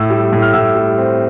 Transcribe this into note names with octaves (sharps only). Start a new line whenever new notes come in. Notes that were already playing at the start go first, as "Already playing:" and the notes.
Already playing: A2 E6
G3
A2
F6
A2 E6
G3
C4